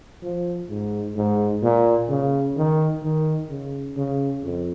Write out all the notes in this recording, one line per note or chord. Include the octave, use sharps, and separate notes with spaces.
F3
G#2
G#2
A#2
C#3
D#3
D#3
C#3
C#3
F2